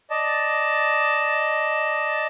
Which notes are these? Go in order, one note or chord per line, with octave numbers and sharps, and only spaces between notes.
D5 D#5 A5